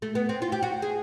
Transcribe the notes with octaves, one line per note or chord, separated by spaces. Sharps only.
A3
B3
C4
F4
G4
F#4
G#4